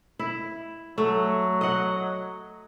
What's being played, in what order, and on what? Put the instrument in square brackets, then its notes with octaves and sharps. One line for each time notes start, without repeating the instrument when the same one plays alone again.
[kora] E4
[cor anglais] F#3 [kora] A3
[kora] D#5 F#5